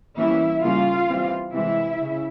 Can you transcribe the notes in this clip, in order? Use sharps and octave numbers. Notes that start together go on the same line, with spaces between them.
E3 G3 A#3 C#4 E4 E5
C#3 G3 A#3 C#4 F4 F5
E3 G3 C4
C3 E3 G#3 C4 E4 E5
C#3